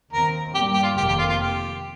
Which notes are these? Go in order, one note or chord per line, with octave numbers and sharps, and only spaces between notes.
D#2 D#3 C4 A#4
G2 G3 A#3 G4
G4
F4
F1 F2 D#3 A#3 G4
G4
F4
F4
G4